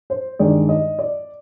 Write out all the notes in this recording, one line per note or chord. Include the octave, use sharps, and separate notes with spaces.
C5
G2 D#3 G#3 D5
D#5
D5